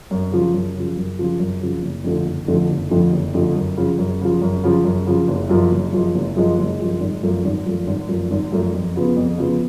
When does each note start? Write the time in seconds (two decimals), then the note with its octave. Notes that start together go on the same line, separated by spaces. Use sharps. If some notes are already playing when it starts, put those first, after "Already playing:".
0.11 F#2
0.32 C#3 F3
0.54 F#2
0.76 C#3 F3
0.97 F#2
1.19 C#3 F3
1.39 F#2
1.61 C#3 F3
1.83 F#1
2.04 F2 D3 F3 A3
2.26 F#1
2.48 F2 D3 F3 A3
2.70 F#1
2.91 F2 D3 F3 A3
3.12 F#1
3.34 F2 D3 F3 A3
3.55 F#2
3.77 C#3 F3
3.99 F#2
4.21 C#3 F3
4.42 F#2
4.64 C#3 F3
4.85 F#2
5.07 C#3 F3
5.28 F#1
5.49 F#2 F3 G#3
5.72 F#1
5.93 F#2 F3 G#3
6.15 F#1
6.36 F#2 F3 G#3
6.59 F#1
6.79 F#2 F3 G#3
7.01 G#1
7.23 F#2 F3 A3
7.45 G#1
7.66 F#2 F3 A3
7.87 G#1
8.09 F#2 F3 A3
8.31 G#1
8.52 F#2 F3 A3
8.74 F2
8.96 C#3 F3 B3
9.17 F2
9.38 C#3 F3 B3